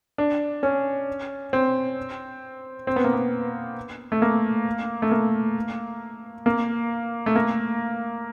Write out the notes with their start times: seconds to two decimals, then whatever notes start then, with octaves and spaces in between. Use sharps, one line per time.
0.18 D4
0.63 C#4
1.53 C4
2.87 C4
2.96 B3
3.04 A#3
3.13 B3
4.12 A3
4.22 A#3
5.02 A3
5.11 A#3
6.46 A#3
7.26 A3
7.36 A#3